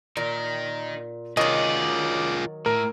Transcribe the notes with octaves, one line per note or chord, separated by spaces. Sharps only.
A#2 D#4 A#4
D#3 F#3 F4 G#4 D5 D#5
A2 A#4